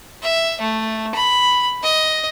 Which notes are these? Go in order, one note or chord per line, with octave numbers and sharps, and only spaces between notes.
E5
A3
B5
D#5